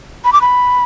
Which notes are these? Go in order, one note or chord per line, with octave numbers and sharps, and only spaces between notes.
B5
D6
B5